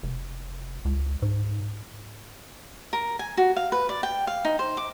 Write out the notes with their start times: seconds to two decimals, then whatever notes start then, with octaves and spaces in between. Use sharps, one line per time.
0.03 F1
0.85 C#2
1.22 G#2
2.93 A#4
3.19 G#5
3.37 F#4
3.56 F5
3.72 B4
3.89 D5
4.03 G5
4.27 F5
4.45 D#4
4.59 C5
4.77 D6